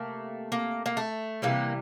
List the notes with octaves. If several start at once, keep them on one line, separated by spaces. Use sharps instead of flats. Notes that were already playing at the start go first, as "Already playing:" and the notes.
Already playing: C3 A3 A#3
A#3
A#3
A3
C3 E3 G3 A#3